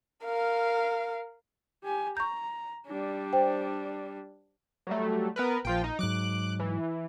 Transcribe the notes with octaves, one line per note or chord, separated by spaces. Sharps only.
A#4 F5
G4 G#5
A#5 C#6 G6
G3 D4
C5 G5
F#3 G3 A3
B3 A#4 B4
A#1 F3 F4 G5
D#4
G#2 F#3 D6 F#6
E3